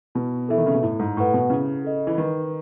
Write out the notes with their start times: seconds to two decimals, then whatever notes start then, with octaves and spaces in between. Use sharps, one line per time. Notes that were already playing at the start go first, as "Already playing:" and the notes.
0.15 B2 E4
0.49 E3 A4 E5
0.58 D#3
0.66 C#3
0.74 B2
0.83 A2 E4
0.99 G#2
1.17 A2 B4 F#5 C#6
1.34 B2
1.50 C#3 E4
1.84 A4 D#5
2.07 E3
2.17 D#3 B4